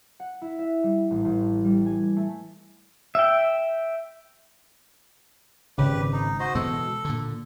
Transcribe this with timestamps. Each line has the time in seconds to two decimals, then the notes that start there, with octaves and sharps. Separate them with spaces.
0.20 F#5
0.42 E4
0.59 E5
0.83 G3
1.11 A1
1.25 A1
1.65 G3
1.86 G#5
2.16 A3
3.15 E5 G5
5.78 G#1 C#3 G4 B4
6.13 D#4
6.40 F#4 C5 D#5
6.55 B2 E3 G#3 A4
7.05 A#2 D3